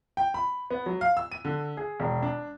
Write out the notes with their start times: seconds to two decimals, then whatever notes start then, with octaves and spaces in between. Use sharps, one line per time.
0.17 G5
0.34 B5
0.70 B3
0.86 F#3
1.01 F5
1.17 E6
1.32 D#7
1.45 D3
1.77 G#4
2.00 E1
2.23 D4